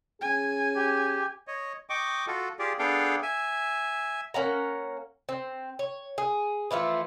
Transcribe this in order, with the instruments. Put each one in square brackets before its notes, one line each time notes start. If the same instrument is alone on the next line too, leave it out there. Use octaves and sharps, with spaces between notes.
[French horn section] C#4 G#4 [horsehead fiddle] G#5
[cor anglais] G4
[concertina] C#5 D#5
D#5 G5 C#6 D6
F4 F#4 A4
F4 G4 G#4 D5
B3 D4 G#4 A4 F5 G5
E5 G#5
[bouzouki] A#3 C#4 F#5 A#5
C4
C#5
G#4
E3 F3 A3 F4